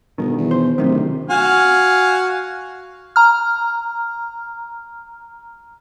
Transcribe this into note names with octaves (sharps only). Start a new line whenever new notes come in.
G1 B2 D#3
E2
C5
D1 F#2 C3 D#3
F#4 F5 G#5
A#5 F6